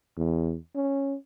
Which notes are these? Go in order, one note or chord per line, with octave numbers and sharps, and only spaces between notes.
E2
C#4